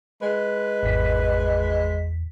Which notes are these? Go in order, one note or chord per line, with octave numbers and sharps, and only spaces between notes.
G#3 B4
G#1 E2 B6